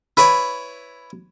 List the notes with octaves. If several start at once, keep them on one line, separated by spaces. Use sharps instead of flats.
E4 B4 C#5 D5